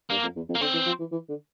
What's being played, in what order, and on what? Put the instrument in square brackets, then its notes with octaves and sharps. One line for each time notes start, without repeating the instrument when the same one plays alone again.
[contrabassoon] G2 [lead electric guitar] A#3
[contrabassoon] F2
E2
F2
[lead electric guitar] A#3
[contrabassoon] D3 [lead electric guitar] C4
[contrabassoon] E3
F3
E3
E3
D3